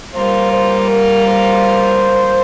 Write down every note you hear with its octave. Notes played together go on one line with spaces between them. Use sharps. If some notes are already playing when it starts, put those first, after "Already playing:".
G3 A#3 F4 C5
C5
A#4
C5